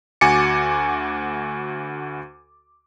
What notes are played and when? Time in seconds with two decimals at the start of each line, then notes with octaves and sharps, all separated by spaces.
0.21 D2 F#4 G#5 D6 A6 C#7